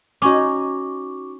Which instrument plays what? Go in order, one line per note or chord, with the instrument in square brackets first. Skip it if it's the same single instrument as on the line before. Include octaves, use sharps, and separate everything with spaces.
[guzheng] C#4 D#4 [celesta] F#4 C#6 D6